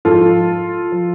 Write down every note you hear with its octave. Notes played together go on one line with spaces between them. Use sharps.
G#2 F3 F4 A4
F3